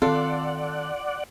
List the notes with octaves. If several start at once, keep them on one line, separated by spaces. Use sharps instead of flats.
D#3 C4 F4 A4 D5 F#5